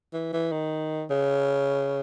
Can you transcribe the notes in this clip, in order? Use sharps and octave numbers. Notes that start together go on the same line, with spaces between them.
E3
E3
D#3
C#3